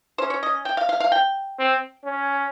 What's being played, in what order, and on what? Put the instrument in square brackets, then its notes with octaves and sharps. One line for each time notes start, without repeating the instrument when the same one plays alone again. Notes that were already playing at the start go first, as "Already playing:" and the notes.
[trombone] C#4 [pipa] C5
[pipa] C#5
D#5
G5
F5
F5
F5
G5
[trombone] C4
C#4